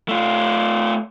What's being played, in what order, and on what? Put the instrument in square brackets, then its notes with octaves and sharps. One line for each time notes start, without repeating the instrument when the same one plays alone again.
[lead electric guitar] A3 F4